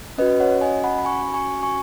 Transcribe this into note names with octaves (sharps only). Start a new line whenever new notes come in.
C#4 F#4 B4 D#5
C#5 F#5
D#5 G#5
F#5 B5
B5
G#5 C#6
G#5 C#6
G#5 C#6